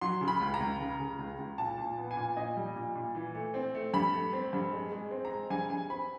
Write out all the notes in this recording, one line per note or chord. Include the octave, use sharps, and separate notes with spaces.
F#3 C6
C#3
B5
C#2
A#5
C#2
C#3
C#3
C#2
C#2
A#2 A5
A#2
B3
G#5
A#2
A#2 D#5
G3
A#2
A#2
E3
A3
C4
A3
G2 B5
A3
C4
G2
G#3
G#3
C4
A#5
G#3
G2 G#5
G2 G#5
C4 B5